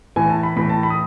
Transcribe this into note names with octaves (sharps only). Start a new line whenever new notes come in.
A2 E3 G#5
A5
B5
A2 E3 B5
A5
B5
D#6